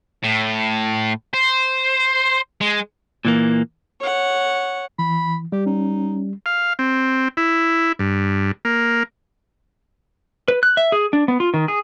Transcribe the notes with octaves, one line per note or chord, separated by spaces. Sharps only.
A2
C5
G#3
A#2 E3 A#3
C#5 F#5
E3 B5
G3 G4
C#4 D#4
F5
C4
E4
G2
A#3
B4
F#6
E5
G#4
D4
B3
F4
D#3
G#4